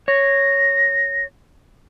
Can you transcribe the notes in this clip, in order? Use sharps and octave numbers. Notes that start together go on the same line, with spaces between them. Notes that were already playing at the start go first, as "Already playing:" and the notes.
C#5 A#6